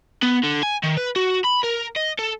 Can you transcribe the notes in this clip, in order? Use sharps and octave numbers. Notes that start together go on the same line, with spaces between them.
B3
D3
G#5
D#3
B4
F#4
B5
A#4
D#5
A4